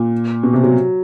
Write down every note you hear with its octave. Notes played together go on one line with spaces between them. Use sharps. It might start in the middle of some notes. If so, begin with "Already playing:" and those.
Already playing: A#2
B2
C3
F#3